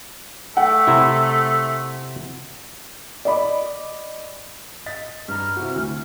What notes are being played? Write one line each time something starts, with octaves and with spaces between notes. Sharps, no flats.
A3 F#5 G5
C3 E4
D5 D#5 B5 D6
D#5 A6 B6
G2 A#5 F6
C3 E4 F#4
D2